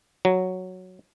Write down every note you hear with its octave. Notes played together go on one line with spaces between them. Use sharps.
F#3